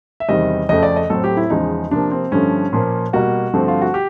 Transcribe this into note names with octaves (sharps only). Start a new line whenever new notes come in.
E5
E2 C3 D#3 G3 C4 D#5
F2 C#3 F3 A3 D#5
D5
D#5
A2 F#3 A3 C4 A4
G4
E4
E2 C#3 F3 G#3 D#4
C3 F3 A#3 D4
C4
G2 D3 F3 A3 C#4
A#2 F3 A#3
B2 G3 A#3 F#4
G2 D3 F3 A3 C4
F4
F#4
G4